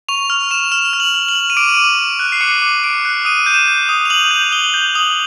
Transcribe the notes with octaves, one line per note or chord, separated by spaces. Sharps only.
C#6 F7
F6 F7
C#6 E7
F6 E7
F6
F#7
F6
F#7
F6
D#7
D6 D7
D6
D6
F#6
C7
D6 C#7
D6
D6 D7
F#6
D#6 D#7
G6
E7
G6
D#6
F7
D#6 F#7
G6
D#6 G7
G6
D#6 F#7